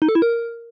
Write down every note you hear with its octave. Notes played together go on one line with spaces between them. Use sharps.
D#4
A4
E4
A#4